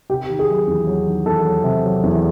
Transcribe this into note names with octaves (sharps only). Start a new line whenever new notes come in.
C3 G4
D#3
G#4
F#3
E2
F#3
D#3
E2 A4
F#3
C3
F#3
E2